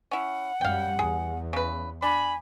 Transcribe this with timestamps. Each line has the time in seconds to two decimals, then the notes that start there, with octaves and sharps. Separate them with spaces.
0.11 C#4 E4 F#5
0.61 F#2 G3 F5 G5
0.99 E2 G#4
1.53 C#3 B4
2.02 D4 G#5 B5